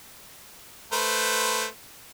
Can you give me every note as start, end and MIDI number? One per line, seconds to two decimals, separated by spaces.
0.92 1.66 57
0.92 1.66 71
0.92 1.66 72